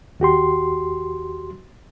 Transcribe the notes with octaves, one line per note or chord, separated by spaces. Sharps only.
D#2 F#4 G4 C6